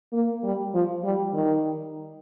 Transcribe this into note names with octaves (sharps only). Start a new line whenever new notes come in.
A#3
G3
F3
G3
D#3